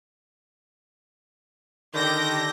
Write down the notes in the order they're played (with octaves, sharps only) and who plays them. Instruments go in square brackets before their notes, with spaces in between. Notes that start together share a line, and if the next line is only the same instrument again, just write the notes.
[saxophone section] D3 D#3 [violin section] G4 G6 A#6